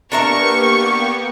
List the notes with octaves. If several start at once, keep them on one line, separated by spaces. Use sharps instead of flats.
A#3 B3 D4 G4 A#4 E5 C#6